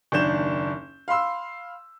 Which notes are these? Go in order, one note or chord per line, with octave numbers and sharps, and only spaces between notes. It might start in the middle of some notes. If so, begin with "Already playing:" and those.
F#1 D#2 D4 G6 E7
F5 B5 C6 E6